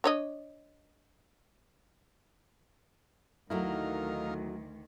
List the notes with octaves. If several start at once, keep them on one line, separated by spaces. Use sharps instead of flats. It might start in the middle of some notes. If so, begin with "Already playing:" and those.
D4 C#5 D#5
D2 D#3 F#3 A3 D#4 E4 A#4 F5